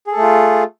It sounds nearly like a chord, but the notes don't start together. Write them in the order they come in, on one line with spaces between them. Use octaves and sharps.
G#4 A4 A3 F4